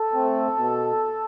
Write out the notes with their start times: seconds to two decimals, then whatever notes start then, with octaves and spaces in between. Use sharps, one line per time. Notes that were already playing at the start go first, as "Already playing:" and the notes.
Already playing: A4
0.12 A3 C4
0.56 B2